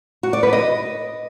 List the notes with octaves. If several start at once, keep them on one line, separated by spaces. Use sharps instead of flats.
F#4
D5
B4
D#5